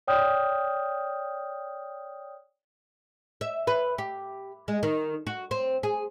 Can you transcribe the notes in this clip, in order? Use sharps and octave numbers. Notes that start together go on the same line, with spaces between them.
C#5 D5 G5 D#6 F6 G6
E5
B4
G4
G#3
D#3
F#4
C4
G#4